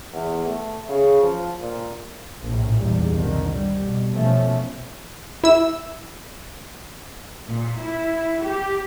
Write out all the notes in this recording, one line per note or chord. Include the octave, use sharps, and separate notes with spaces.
E2
A3
C#3
F3
A#2
A#1 A2
E2 G#2 G3
C2 F2 D3 D#3
G3
B2
B2 F3 A3 B3 C#4
E4 E6
A#2
E4
G4